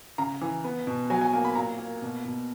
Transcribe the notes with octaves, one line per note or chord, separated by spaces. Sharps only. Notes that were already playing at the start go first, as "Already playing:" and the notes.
C#3 A#5
E3
B3
B2
F#3 G#5
G#5
A#3 G#5
B5
A#2 A#5
A#3
B2
B2